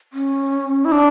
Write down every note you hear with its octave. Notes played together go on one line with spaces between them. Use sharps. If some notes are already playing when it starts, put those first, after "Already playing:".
C#4
E4
D4